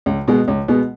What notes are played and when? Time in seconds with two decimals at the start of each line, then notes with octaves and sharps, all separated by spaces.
0.06 C#2
0.28 B2 G#3 B3
0.48 C#2
0.68 B2 G#3 B3